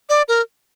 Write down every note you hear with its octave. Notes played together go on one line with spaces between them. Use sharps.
D5
A#4